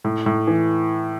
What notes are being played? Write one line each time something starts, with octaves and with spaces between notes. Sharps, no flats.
A2
A2
E3